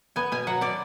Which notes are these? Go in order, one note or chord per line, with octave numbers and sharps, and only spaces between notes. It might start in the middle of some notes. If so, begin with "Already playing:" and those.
B3 G#5
B2 G#5
F#3 F#5
B2 D5